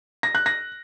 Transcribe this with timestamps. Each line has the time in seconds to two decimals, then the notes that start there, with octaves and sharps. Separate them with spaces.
0.23 A#6
0.35 F#6
0.46 A#6